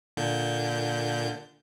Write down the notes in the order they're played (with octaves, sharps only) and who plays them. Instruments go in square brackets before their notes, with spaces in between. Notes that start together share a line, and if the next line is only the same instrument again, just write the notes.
[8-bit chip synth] A#2 D3 G6